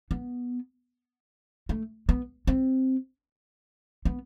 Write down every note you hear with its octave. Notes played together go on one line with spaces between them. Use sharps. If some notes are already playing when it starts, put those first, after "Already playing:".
B3
A3
B3
C4
B3